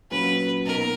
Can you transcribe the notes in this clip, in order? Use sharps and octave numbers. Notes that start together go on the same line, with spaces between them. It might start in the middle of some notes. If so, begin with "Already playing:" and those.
A#2 F#3 C#4 B4
B2 A#3 D#4 A#4